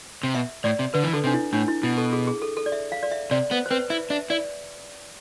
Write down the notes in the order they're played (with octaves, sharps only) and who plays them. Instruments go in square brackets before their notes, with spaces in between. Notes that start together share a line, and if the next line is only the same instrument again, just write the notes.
[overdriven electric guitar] C3
[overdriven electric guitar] B2 [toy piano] E5
[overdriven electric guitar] A2 [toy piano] D5
[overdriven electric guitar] C3
[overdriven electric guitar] D3 [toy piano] B4
[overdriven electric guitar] E3
[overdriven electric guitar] D3 [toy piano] A4
[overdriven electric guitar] C3 [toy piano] D4
[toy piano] E4
[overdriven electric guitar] A2 [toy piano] D4
[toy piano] E4
[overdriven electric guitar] B2 [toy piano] E4
[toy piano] A4
G#4
G#4
A4
A4
D5
E5
F5
D5
E5
[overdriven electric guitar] C3 [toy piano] D5
[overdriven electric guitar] B3 [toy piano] C5
[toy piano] C5
[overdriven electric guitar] C4 [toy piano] B4
[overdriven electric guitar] E4 [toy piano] E5
[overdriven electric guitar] D4 [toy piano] E5
[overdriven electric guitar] E4 [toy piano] D5